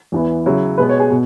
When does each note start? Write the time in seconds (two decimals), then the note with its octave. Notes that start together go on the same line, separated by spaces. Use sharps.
0.12 E2 E3 B3 E4
0.46 C#3 F#3 E4
0.78 B2 G#3 B3 B4
0.89 C#5
1.00 G#4
1.10 B2